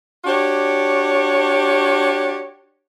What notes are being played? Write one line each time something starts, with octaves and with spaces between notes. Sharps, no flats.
D4 F#4 G4 C#5